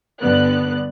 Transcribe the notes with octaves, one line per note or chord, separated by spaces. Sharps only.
G2 D3 B3 D5 F#6